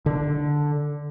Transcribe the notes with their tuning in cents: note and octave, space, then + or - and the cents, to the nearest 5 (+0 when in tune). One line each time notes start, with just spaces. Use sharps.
D3 +0